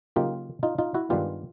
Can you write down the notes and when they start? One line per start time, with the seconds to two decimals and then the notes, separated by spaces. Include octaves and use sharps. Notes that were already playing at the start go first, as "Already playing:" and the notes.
0.16 C#3 F#3 A#3 D#4 F4 G4
0.63 D#4 F4
0.78 D#4 F4
0.94 E4 F#4
1.10 G2 D#3 G#3 B3 D4 F4 G4